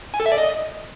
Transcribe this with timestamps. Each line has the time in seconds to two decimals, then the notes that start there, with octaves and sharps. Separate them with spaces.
0.14 G#5
0.20 A4
0.26 E5
0.32 D5
0.38 D#5